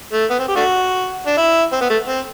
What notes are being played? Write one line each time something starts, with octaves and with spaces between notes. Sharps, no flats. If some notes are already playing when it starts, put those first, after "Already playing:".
A3
B3
C4
G4
A3 D4 F#4
D4
E4
C4
B3
A3
C4